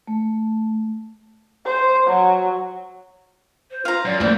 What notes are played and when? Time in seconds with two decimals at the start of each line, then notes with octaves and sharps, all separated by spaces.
0.07 A3
1.65 C5
2.06 F#3
3.71 C5
3.85 F4 F5 A#5
4.05 F#2 D5
4.20 E3 A3 A#3 C5